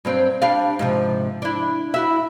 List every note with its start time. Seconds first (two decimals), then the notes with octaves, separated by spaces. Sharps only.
0.05 G2 F#3 C4
0.42 G3 D4 F5
0.79 G#2 C3 F3
1.42 D4 E4
1.94 E4 F#4 E5